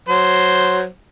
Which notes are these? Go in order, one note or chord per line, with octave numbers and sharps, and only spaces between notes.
F#3 C5